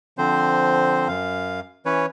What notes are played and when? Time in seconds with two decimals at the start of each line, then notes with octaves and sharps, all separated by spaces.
0.18 D3 F3 C4 C5
1.08 F#2 F5
1.86 E3 C#4 B4 C#5